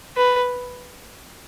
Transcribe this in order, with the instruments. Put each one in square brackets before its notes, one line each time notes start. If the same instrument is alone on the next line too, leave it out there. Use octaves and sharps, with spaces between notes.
[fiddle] B4